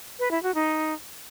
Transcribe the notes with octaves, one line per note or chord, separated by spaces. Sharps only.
B4
E4
F#4
D#4